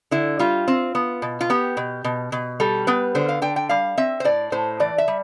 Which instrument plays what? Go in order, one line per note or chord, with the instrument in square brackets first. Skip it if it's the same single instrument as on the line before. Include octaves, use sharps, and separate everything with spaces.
[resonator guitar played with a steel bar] D3 E4
G3 F4
C4
B3
B2
F4
B3 G4
B2
B2
B2
G3 A4
B3 B4
D3 C5
F5
D3 G5
G5
G3 F5
C4 E5
C5
A2 D5
A2 C5
E3 D5
E5
G3